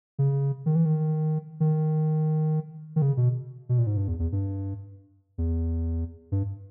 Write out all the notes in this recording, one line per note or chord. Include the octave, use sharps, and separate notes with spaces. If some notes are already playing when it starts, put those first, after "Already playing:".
C#3
D#3
E3
D#3
D#3
D#3
C#3
B2
B2
A#2
G#2
G2
E2
E2
G2
E2
G2